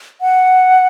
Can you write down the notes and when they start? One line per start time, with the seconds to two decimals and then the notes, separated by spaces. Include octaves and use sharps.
0.21 F#5